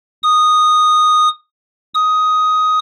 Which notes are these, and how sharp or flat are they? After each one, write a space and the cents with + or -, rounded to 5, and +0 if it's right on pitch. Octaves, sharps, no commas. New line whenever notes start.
D#6 -10
D#6 +10